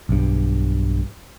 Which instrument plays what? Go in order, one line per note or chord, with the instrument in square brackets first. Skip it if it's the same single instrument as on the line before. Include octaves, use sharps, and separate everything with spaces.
[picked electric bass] B1 G2